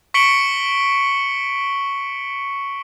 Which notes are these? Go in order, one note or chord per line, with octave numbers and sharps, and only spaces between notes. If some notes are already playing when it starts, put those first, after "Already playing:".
C#6 B6 C#7 D7 F#7 G7